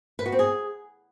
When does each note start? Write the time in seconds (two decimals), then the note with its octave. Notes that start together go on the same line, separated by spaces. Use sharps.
0.19 B4
0.26 F#4
0.32 C4
0.39 G#4